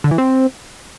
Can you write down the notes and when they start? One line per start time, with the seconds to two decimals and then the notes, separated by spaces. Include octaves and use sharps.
0.04 D3
0.11 E3
0.18 C4